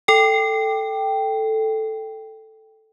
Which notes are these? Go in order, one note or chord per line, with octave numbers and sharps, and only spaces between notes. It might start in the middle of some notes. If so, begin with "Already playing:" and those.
A4 G5